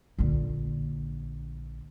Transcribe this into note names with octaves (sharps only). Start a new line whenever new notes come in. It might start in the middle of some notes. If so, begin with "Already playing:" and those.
A#1 D3